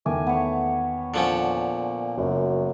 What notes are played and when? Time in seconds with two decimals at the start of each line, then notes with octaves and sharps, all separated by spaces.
0.06 E2 D#3 A3 G#5 D6
0.27 B3 C#5
1.14 A#2 D3 F3 C#4
2.18 F#1 F#2